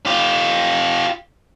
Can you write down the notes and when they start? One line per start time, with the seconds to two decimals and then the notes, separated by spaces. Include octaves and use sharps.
0.06 F4 G4